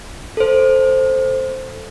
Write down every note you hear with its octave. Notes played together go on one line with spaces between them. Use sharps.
A4 C5